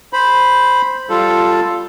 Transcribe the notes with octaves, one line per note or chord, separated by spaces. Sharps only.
C5 B5
G3 F4 A4